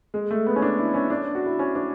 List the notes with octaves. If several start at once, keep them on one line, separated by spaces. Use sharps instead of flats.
G#3
A3
B3
C#4
D4
E4
C#4
D4
F#4
E4
C#4
D4